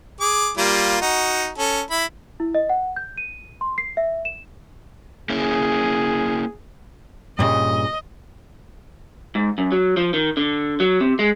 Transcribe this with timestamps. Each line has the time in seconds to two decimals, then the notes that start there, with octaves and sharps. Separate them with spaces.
0.21 G#4 D6
0.57 G3 A#3 F4
1.01 D#4 F#4
1.58 C#4 A4
1.91 E4 B5
2.40 E4
2.55 D#5
2.69 F#5
2.96 G6
3.18 D#7
3.61 C6
3.78 C7
3.97 E5
4.25 E7
5.30 A#3 C#4 E4 G#4
7.39 G2 A#2 C#3 D#5
9.35 G#2
9.58 F#2
9.72 F#3
9.97 F3
10.14 D#3
10.37 D3
10.80 F#3
11.00 C3
11.19 G#3